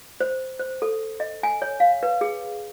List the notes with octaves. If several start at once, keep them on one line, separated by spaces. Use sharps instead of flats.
C5
C5
A4
D#5
G#5
C#5
F5
B4
G#4